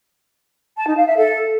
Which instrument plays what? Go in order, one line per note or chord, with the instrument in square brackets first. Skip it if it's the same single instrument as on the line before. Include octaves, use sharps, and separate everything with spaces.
[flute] A5
D#4
F5
E5
A4